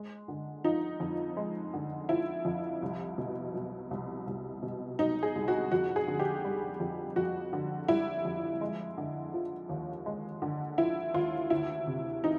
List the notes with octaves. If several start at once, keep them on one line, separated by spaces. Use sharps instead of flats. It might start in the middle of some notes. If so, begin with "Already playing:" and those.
Already playing: G#3
D3
F3 D#4
F2
G#3
D3
F3 E4
F2
C2
B2
F#3
C2
C2
B2
F#3 D#4
G#4
C2
F#4
F2 F#4
G#4
D3
G4
G3
F2
F2 F#4
D3
G3 E4
F2
G#3
D3
F3
D#2
G#3
D3
F3 E4
D#2 F4
D2 E4
C3
E3 D#4